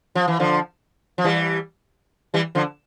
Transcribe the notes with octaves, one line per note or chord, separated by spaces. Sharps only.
F3
E3
D3 F3
F3
E3 G3
E3 G3
D3 F3